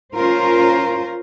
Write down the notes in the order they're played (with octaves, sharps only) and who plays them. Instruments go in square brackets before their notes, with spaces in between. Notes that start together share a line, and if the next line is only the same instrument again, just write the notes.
[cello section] C#4 F4 A#4 C5